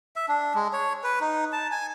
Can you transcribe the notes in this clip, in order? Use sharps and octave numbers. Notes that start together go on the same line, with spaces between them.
E5
D4
G#3
C#5
B4
D#4
A5
G#5